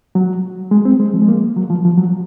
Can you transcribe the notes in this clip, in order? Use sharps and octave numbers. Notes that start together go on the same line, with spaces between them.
F#3
G#3
C4
G#3
F3
G#3
A#3
F#3
F3
F3
F#3